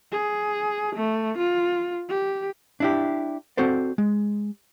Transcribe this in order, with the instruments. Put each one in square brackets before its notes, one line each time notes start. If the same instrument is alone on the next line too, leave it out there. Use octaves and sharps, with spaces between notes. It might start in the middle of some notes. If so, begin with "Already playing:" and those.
[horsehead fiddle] G#4
A3
F4
G4
[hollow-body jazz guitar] D4 E4 G4
C4 F#4 A4 C5 D5
G#3